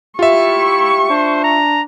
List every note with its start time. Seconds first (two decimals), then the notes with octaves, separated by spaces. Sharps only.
0.19 E4 F4 G4 E5 C#6
1.10 D4 C5
1.44 A#5